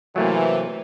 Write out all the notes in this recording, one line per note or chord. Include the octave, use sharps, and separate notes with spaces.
C3 E3 F#3 A3 A#3